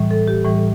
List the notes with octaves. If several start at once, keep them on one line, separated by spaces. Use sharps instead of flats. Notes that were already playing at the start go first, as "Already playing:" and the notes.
Already playing: A2 E3 G3
A4
G4
A2 E3 G3